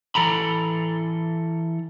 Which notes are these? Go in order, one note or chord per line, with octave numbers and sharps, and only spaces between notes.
E3 A4 A#5 B5